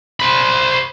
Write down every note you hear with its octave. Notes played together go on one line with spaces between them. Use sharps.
C5 B5